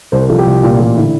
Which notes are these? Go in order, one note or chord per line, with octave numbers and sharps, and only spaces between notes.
C2 C5
A#4
F3 A4
G4
C2
A#2
A1 G4
D3 E4